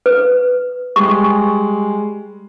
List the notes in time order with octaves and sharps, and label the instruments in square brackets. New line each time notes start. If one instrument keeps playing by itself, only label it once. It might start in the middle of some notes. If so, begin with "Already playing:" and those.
[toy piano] B4
[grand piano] G3 G#3 [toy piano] C#6